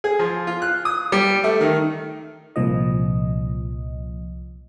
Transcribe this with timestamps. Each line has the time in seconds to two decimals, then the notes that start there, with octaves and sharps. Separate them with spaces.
0.04 G#4
0.19 F3
0.47 F4
0.62 F#6
0.85 D#6
1.12 G3
1.44 A3
1.60 D#3
2.56 C2 A#2 F3 D#5